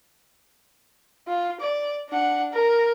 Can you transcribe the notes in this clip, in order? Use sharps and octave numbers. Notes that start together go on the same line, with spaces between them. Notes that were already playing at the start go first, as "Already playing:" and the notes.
F4
D5
D4 F#5
A#4